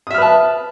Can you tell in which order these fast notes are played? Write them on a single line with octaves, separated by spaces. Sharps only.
D#6 E5 F6 B4 A5